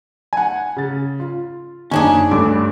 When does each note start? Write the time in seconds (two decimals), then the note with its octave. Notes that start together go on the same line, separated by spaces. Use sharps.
0.33 F#5 G#5
0.77 C#3 A6
1.20 F4
1.91 F#1 D#3 C#4 D4 G#4
2.31 D2 G2 D6